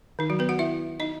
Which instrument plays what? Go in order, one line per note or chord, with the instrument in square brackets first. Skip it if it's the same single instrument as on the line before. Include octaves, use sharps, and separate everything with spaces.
[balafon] D#3 D#4
F#3 F#4
B3 B4
F#4 F#5
E4 E5
D#4 D#5